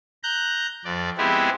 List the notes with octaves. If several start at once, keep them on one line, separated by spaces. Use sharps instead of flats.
A#5 F#6 G6
F2 D5
G#3 B3 C4 E4 G4 G#4